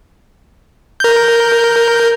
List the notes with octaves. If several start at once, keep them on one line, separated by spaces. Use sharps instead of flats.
A#4 G6